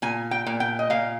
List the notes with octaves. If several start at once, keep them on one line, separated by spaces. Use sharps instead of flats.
A#2 G#5
G5
A#2
G5
D#5
A#2 F5